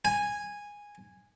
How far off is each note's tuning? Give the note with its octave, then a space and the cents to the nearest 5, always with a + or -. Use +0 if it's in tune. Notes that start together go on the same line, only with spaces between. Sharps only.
G#5 -10